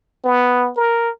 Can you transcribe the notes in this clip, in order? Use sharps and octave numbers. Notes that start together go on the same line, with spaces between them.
B3
A#4